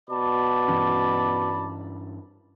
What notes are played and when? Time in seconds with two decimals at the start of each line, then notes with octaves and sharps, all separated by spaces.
0.10 B2 D5 A5 B5
0.68 G2 E3 C#4